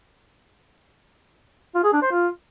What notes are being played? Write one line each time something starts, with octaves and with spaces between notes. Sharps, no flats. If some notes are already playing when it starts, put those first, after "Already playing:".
F4
G#4
D4
C5
F4